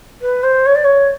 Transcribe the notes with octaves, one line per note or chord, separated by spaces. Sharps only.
B4
C5
C#5
D5
C#5